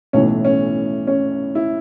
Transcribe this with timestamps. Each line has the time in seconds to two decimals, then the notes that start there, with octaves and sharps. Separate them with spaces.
0.13 B1 A2 E3 C#4
0.44 C#4
1.07 C#4
1.55 E4